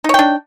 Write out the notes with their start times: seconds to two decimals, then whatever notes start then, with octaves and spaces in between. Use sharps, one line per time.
0.04 D#4
0.09 C#5
0.14 G5
0.19 D4